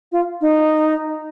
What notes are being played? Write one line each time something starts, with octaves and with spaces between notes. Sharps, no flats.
F4
D#4